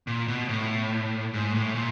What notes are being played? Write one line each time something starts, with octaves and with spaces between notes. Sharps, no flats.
A#2
B2
A2
G#2
A2
A#2